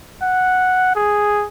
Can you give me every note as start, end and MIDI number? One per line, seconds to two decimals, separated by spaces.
0.23 0.93 78
0.96 1.46 68